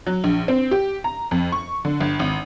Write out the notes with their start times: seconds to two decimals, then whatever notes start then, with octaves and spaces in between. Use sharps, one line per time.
0.07 F#3
0.24 A#1
0.48 C4
0.71 G4
1.04 A#5
1.31 F2
1.52 C#6
1.85 D3
2.00 G1
2.19 G#1